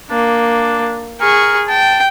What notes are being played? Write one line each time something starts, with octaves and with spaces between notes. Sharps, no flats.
A#3 D4
G#4 A#4 C#6
G5 A5